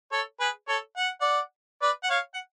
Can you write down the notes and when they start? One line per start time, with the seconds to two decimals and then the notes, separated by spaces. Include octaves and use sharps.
0.12 A4 C#5
0.40 G#4 B4
0.68 A4 C#5
0.97 F#5
1.21 D5 F#5
1.82 B4 D5
2.03 F#5
2.10 C#5 F5
2.34 F#5